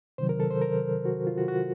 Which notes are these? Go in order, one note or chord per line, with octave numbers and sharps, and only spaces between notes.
C3 D#3 F#3 C5
A#4
A4
C5
A#4
F#4
F4
F#4
F#4